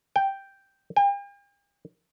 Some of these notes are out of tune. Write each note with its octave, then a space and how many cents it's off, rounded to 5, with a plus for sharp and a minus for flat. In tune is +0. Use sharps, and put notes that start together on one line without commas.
G5 +0
G5 +45